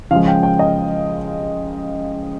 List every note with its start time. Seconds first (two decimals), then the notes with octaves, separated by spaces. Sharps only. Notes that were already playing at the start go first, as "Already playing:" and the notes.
0.11 C#3 F3 G#3 F5
0.28 G5
0.43 G5
0.59 D#5